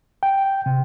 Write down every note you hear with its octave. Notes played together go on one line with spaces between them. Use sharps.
G5
C3